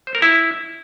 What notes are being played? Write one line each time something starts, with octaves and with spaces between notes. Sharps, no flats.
C5
A#4
E4